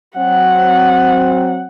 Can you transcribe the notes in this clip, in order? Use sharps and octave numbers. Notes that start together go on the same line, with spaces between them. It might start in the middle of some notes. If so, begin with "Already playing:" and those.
F#3 C4 F#5